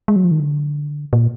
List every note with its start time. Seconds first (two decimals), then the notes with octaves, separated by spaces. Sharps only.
0.08 G#3
0.16 F#3
0.24 F3
0.31 D#3
0.40 D3
1.13 A#2